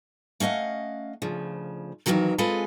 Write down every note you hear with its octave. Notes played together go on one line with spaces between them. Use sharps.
A3 C#4 D#5 F5 F#5
D2 C#3 F3
F2 A2 D#3 E3 F#3 A#4
G#3 C4 F4 G#4 A4 B4